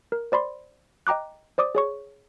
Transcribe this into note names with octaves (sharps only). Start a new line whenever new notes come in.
A#4
C5 D5 B5 C6
D#5 G5 A#5 D6 F#6
C5 D5 D6 D#6
G#4 C#5 C#6